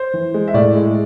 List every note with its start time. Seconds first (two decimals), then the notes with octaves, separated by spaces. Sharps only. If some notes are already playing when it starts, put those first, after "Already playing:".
Already playing: C5
0.14 E3
0.34 G#3
0.48 E5
0.54 A2 D5
0.75 G#3